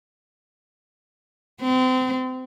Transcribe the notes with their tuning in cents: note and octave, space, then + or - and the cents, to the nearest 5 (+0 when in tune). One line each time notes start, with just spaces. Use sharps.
C4 -30